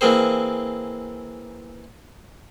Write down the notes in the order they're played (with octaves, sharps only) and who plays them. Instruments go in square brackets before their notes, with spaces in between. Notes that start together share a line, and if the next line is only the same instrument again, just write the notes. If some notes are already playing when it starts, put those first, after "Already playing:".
[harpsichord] E3 A#3 C4 G#4 C5